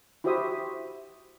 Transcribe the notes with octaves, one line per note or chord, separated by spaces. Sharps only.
E4 F#4 G4 C5 E5 D#6